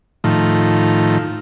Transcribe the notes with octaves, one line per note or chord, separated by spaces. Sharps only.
A2 D#3 F3